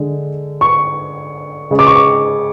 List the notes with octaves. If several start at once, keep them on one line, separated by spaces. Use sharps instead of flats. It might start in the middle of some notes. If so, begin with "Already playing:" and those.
Already playing: D3 G#3
C#6
C#3 G#3
D6
C#6
D6